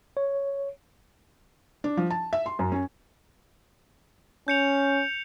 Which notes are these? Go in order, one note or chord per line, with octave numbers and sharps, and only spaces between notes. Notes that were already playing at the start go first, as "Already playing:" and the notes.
C#5
D4
F3
A5
E5
C6
F#2
C#4
C#4 G6 C#7 F7